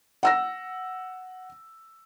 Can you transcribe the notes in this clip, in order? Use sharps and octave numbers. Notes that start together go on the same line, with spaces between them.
F#5 E6 A#6